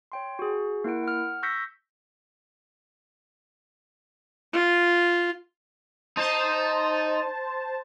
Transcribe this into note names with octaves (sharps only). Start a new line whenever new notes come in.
C#5 G5 C6
F#4 G#4
A#3 E4 A#4 F#5 D7
F#5 F6
C#6 E6 G6 A#6 B6 C#7
F4
D#4 C5 A5